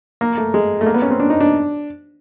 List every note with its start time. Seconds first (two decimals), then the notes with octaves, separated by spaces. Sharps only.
0.21 A#3
0.37 A3
0.54 G#3
0.81 A3
0.86 A#3
0.94 B3
1.02 C#4
1.11 C4
1.20 D4
1.30 D#4
1.40 D4